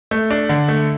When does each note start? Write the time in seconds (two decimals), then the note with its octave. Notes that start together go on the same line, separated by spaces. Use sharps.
0.11 A3
0.31 D4
0.49 D3
0.68 A3